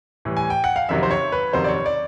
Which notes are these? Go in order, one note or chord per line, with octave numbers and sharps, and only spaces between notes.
A2 E3 G3
G#5
G5
F#5
F5
F#1 F2 C3 D#3 F#3 E5
C5
C#5
B4
F#1 F2 C3 D#3 F#3 C5
D5
C#5
D5